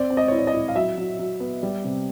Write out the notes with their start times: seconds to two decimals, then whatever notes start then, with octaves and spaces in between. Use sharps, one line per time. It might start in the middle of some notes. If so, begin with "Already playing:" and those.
Already playing: C4 D5
0.10 C4
0.17 D#5
0.28 E4 C#5
0.38 D5
0.47 D#5
0.54 E4
0.68 F5
0.75 F#3 E5
0.98 F#3
1.19 F#3
1.40 B3
1.63 G3
1.84 C3